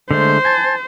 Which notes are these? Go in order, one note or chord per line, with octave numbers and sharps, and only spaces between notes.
D3 G#3 A3 C5
G#5 A5